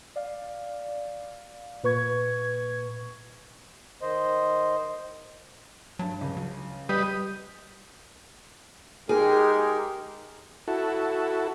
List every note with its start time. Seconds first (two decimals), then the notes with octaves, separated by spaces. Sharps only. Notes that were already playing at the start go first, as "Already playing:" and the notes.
0.16 D5 F5
1.83 A#2 B4 C#6 G#6
4.02 D#3 C5 D#5
5.99 G2 F#3 A5
6.21 C#2
6.37 F#3
6.89 G3 G4 B4 D#5
9.09 G#3 D#4 G4 G#4 A#4
10.68 E4 F#4 A4